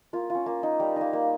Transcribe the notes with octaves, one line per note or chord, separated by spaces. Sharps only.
A#3 F4
F4
C#4
A#3
D#4
G3 G4
A#3 D#4
A#3